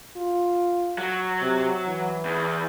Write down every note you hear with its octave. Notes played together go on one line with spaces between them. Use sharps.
F4
F#3
C3
E3
E2